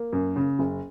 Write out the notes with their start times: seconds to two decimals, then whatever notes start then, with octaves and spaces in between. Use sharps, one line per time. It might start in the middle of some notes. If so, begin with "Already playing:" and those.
Already playing: A#3
0.13 F#2
0.36 C#3
0.59 F#1